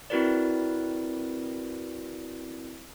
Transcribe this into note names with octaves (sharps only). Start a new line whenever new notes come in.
C4 E4 F#4 A#4 B4 D5